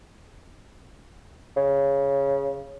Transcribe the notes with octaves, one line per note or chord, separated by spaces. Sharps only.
C#3